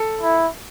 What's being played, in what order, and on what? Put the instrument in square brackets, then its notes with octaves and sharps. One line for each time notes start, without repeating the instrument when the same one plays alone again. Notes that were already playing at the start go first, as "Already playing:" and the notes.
Already playing: [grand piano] A4
[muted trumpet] E4